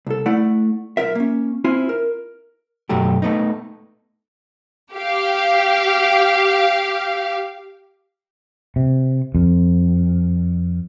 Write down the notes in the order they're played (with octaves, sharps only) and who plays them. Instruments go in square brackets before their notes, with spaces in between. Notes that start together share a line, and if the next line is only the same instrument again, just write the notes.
[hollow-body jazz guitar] C2 A4
A3 E4 D5 F#5
B1 A#2 F4 A#4 E5
A#3 C#4
C4 E4 F4 G#5
A#4
F#2 B2 F#3 A3 G4
A3 B3 D#4
[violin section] G4 F5
[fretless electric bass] C3
F2